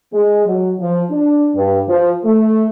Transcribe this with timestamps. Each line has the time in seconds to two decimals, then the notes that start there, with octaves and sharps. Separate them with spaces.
0.13 G#3
0.45 F#3
0.80 F3
1.11 D4
1.55 G2
1.87 F3
2.24 A3